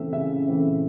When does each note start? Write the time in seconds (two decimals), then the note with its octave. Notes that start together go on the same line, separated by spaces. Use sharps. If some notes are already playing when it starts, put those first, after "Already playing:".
Already playing: C#3 E3 A3 C4 E5
0.13 C#3 E5
0.48 E3 A3 C4